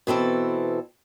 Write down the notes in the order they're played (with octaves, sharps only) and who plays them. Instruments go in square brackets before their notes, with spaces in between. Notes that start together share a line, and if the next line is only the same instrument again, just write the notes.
[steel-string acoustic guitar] B2 E3 C4 A4